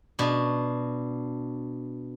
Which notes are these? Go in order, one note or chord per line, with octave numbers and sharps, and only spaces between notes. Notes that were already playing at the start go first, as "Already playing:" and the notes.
B2 D4